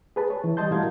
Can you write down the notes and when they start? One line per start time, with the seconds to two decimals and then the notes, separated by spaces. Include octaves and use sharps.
0.16 G#4 B4 A5
0.30 C#5
0.44 E3
0.57 G3 D#5 A5 C6 G6
0.71 A2 E4 F#4 A#4 F5 G#6